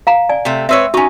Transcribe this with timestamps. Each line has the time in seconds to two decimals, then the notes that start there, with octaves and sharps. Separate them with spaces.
0.07 F5 A#5
0.29 D5 G#5
0.45 C3 A3
0.69 C4 B4 C#5 E5 E6
0.94 C#4 D#4 F#4 C#6